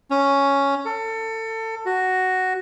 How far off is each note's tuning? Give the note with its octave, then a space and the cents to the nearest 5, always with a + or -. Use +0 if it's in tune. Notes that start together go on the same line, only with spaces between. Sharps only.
C#4 +5
A4 +25
F#4 +5